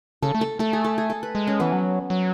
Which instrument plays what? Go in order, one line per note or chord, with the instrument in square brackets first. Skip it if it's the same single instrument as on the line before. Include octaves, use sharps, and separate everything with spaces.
[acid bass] C#3 [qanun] A4
[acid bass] A3
[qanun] A4
[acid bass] A3 [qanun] A4
[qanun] G#4
A4
G#4
A4
B4
[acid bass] G#3
[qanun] C#4
[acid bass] E3 [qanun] B3
[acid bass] F#3
F#3